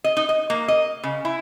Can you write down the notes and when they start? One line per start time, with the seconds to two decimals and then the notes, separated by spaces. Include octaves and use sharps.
0.04 D#5
0.17 D#4
0.29 D#5
0.50 A#3
0.68 D#5
1.03 C#3
1.25 E4